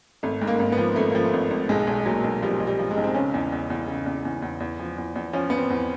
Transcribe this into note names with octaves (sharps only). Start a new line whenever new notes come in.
G#1 A3
G#2
A#3
G#1
B3
F3
G#1 A3
A#3
F3
A3
G#1
G#1
B1 G#3
B1
A#2 F#3
B1
F3 G3
B1
G3
F3
G#3
B1
C4
C#3 C#4
E2
E2
E2
C#3
E2
E2
E2
E2
F3
E2
E2
F3 C#4
F3 B3
C4
E2